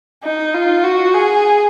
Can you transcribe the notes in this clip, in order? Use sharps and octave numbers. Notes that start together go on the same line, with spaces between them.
D#4
F4
F#4
G#4